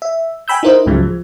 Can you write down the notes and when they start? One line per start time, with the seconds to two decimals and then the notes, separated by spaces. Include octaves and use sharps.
0.02 E5
0.48 G5 G#5 B5 E6 G6
0.63 D#4 E4 A#4 C5 D#5
0.86 C#2 G#2 C#3 F3 F#3 G#3
1.03 F3